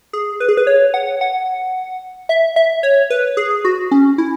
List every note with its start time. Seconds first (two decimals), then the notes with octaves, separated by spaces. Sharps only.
0.13 G#4
0.40 B4
0.49 G#4
0.57 B4
0.67 C#5
0.94 F#5
1.21 F#5
2.29 E5
2.56 E5
2.83 C#5
3.10 B4
3.37 G#4
3.65 F#4
3.91 C#4
4.18 E4